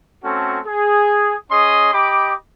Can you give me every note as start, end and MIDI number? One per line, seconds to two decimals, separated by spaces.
0.24 0.59 57
0.24 0.59 60
0.24 0.59 61
0.24 0.59 66
0.24 0.59 69
0.66 1.36 68
1.51 1.90 61
1.51 1.90 68
1.51 1.90 75
1.51 1.90 84
1.51 1.90 87
1.94 2.33 67
1.94 2.33 75
1.94 2.33 83
1.94 2.33 86